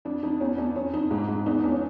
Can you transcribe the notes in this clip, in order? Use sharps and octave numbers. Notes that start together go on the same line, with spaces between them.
F2 D4
F2 D#4
E2 C#4
E2 D4
F2 C#4
F2 D#4
G#2
G#2
E2 D#4
D4
E2
C#4